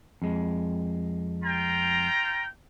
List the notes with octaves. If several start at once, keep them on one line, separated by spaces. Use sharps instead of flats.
F2 G#3
F4 G5 A#5